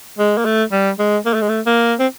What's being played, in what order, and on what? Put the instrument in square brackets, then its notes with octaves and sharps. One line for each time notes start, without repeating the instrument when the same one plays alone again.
[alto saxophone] G#3
A#3
A3
G3
G#3
A#3
A3
G#3
A3
A#3
C4